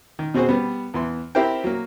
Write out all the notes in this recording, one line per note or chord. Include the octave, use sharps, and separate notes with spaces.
D#3
B2 C4 F#4 G#4 C5
G3 B3
E2 E3 C6
C4 E4 G4 A#4 C5 G5
F#3 A#3